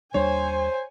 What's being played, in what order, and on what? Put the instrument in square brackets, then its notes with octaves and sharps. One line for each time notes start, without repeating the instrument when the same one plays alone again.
[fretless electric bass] D#2 G3 D4 [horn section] C5 [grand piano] C#5 [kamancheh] G#5